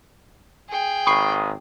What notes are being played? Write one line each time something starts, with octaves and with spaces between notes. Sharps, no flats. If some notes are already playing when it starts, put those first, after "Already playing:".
G#4 G5
G#1 B5 C#6 D#6 C7